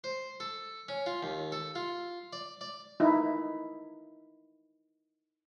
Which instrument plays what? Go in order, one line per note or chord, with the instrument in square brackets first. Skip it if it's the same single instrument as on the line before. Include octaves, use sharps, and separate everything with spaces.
[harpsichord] C5
A4
C#4
F4
D#2
A4
F4
D5
D5
[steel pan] D#4 E4